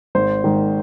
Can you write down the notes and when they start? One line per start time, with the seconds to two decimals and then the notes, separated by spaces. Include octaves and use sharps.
0.15 G#1 C5
0.44 G#2 D#3